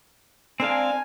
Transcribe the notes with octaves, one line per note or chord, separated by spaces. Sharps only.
G#3 C4 D4 A#4 F5 G#5